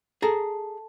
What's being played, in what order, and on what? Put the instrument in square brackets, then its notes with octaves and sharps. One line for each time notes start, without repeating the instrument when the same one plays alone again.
[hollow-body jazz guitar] G#4 A#5 [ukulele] A4